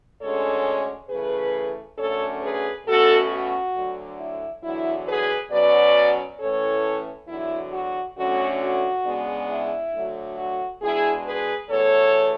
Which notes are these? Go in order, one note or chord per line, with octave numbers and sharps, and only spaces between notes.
D2 D3 G#3 C#4 A4 C#5
C#3 E3 A3 G#4 B4
F#2 D3 A3 C#4 A4 C#5
G#4 B4
B2 A3 C#4 F#4 A4
F#4
D2 D3 F#3
E4
E2 D3 F#3 E4
G#4 B4
B2 F#3 C#4 B4 D5
A2 E3 A3 C#4 A4 C#5
E2 D3 F#3 E4
F#4
D2 D3 F#3 A3 C#4 F#4
F#4
C#3 G#3 B3 D4
E4
D2 D3 F#3 A3
F#4
B2 G#3 D4 E4 G#4
G#4 B4
E2 B2 A3 A4 C#5